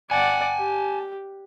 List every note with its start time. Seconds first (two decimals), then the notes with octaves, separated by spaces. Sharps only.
0.11 D5 F#5 G#5 A5
0.58 G4